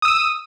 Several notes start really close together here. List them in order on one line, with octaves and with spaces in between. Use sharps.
D#6 E6 D#7